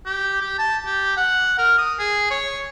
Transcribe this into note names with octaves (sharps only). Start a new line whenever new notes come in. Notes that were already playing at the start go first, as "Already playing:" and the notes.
G4
G4
A5
G4
F#5
A#4
D#6
G#4
C#5